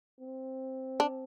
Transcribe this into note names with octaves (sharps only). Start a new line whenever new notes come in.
C4
D4